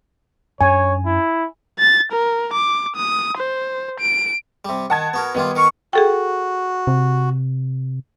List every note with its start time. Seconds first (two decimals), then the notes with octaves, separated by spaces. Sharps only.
0.61 F#2 C#4 D4 C#5 G#5
1.05 E4
1.79 A6
2.12 A#4
2.53 D6
2.96 D#6
3.37 C5
4.00 D7
4.65 C3 G3
4.90 D#3 F#5 A5 G#6
5.14 B3 F#4 A#4
5.35 D#3 G3 B3 F4
5.56 D#3 A#4 C#6
5.93 F#4 G#4 A4 G5
6.87 C3